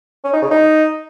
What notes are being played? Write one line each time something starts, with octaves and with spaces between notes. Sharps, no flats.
C#4
D#4
C#3
D#4